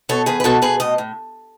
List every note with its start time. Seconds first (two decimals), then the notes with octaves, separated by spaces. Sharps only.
0.09 B2 A4 C#5
0.26 E2 G#4 B4
0.40 B4
0.44 B2 F#4 A4
0.62 B2 G#4 B4
0.80 A2 D#5
0.98 A2